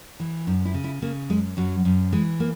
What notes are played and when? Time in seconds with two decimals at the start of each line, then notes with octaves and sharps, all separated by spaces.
0.20 E3
0.47 F#2 D#4
0.65 E4
0.74 C#3
0.84 E4
1.02 C#3 A#3
1.30 F#2 G#3
1.57 F#2 F#3
1.85 F#2
2.12 E3 G#3
2.40 A#3